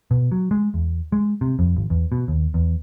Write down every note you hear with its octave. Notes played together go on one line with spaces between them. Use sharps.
B2
F#3
G#3
E2
G#3
C3
F2
G#1
E2
B2
D#2
E2